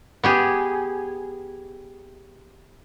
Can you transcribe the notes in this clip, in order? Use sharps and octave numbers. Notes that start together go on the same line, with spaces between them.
B3 G4 G#4